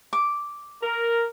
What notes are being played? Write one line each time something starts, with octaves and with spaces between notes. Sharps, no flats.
D6
A#4